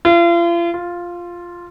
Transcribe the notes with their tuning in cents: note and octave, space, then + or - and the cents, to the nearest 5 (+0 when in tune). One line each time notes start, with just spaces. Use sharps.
F4 -40
F4 +0